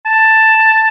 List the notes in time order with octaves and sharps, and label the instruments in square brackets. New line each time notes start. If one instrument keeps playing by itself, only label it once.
[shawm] A5